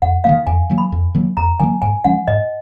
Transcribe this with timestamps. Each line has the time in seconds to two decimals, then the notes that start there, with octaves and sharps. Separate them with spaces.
0.02 F2 F#5
0.24 D#3 F#3 A#3 F5
0.47 F2 G#5
0.70 D#3 F#3 A#3
0.78 B5
0.92 F2
1.15 D#3 F#3 A#3
1.37 F2 A#5
1.60 D#3 F#3 A#3 G#5
1.82 G#2 G#5
2.04 F3 G#3 C#4 F#5
2.28 G#2 D#5